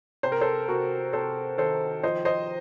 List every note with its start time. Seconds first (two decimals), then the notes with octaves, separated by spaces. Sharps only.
0.23 C3 C5
0.32 A#4
0.41 A4 C5
0.68 C3 F#4 A#4
1.13 C3 A4 C5
1.58 D#3 A4 C5
2.03 F3 C5 D#5
2.25 C5 D#5